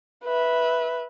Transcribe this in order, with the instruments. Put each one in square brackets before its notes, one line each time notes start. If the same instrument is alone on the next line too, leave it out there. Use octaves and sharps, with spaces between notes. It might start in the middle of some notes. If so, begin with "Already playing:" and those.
[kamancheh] B4 E5